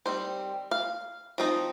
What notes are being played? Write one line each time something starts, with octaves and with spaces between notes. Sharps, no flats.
D#3 G3 C4 C5
F5
F3 C4 D#4